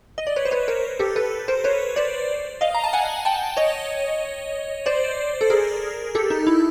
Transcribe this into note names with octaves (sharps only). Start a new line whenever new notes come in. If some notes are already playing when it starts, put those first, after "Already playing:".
D#5
D5
B4 C#5
C5
B4 C#5
A#4 C5
G4 A4
A4 B4
A#4 C5
B4 C#5
C5 D5
D#5 F5
A#5
A5
F#5 G#5
G5 A5
C#5 D#5
C5 D5
A4
G#4 A#4
G4 A4
D#4
E4